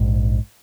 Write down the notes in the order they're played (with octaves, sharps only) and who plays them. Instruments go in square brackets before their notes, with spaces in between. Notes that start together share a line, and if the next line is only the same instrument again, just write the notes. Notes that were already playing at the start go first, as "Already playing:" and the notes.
Already playing: [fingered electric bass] A#1 G#2